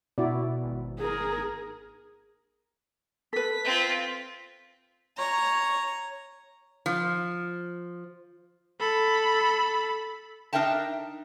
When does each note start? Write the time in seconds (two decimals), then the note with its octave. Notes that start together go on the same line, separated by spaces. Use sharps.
0.18 B2 E4 F#4 D5
0.64 G#1
0.99 G#4 A#4
3.33 A4 B4 B6
3.64 C4 F4
5.18 C#5 A#5
6.86 F3
8.80 A4 B5
10.53 D4 D#4 A#4 E5 G5 A5